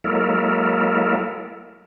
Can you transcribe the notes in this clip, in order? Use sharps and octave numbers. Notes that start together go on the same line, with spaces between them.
F#3 G#3 A#3 E4 A4 A#4